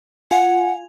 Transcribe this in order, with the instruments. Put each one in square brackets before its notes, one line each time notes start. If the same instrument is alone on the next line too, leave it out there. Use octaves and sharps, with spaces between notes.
[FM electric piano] F4 G#5 [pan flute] F#5